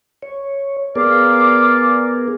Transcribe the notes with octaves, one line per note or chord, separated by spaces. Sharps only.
C#5
B3 G#4 A#4 D5 F5 D6